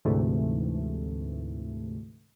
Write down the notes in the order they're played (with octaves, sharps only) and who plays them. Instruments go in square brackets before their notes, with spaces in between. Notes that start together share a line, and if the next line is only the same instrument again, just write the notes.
[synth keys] D2 G#2 C3 E3 A3